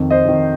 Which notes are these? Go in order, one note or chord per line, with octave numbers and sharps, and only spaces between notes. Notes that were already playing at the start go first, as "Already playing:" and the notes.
Already playing: F2 D#3
C5 D#5
F2 D#3